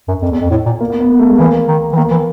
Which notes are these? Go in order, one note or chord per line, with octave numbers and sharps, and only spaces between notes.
F#2
F2
E2
F2
A2
A#2
A#3
B3
B3
A#3
A3
G#3
E3 A#3
D#3
E3
D#3 A#3
E3